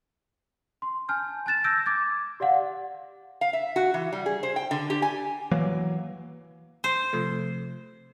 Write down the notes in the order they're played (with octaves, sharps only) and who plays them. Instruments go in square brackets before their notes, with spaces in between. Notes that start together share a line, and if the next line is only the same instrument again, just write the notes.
[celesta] C6
G#5 A5 F6 G6
A5 F#6 A6 E7
E6 G6 A#6 D7
D6 G#6 A6
G4 D5 F5 F#5
[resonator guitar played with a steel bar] F5
E5
F#4
E3
G3
G#4
C5
G5
D3
G4
G#5
[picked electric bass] E3 F#3 A#3
[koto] C5
[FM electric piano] C3 F3 A3